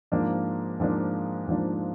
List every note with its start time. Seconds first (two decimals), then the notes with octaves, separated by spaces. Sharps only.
0.12 G#2 F3 A#3 D4
0.80 G#2 F3 A#3 D4
1.48 G#2 F3 A#3 D4